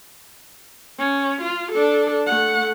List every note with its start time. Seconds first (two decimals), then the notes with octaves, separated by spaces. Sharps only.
0.98 C#4
1.41 F4
1.72 D4 A4
2.27 A3 F#5